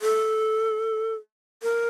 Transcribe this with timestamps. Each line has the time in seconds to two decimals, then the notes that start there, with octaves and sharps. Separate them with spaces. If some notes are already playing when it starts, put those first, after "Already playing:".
0.02 A4
1.63 A#4